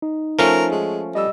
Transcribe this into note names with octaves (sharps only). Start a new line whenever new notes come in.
D#4
F3 A3 C#4 A#4
G#3
G3 D#5 E6